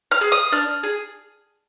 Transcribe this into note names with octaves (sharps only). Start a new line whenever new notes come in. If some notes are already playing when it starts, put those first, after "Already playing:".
F6
G#4
D#6
D4 F6
G#4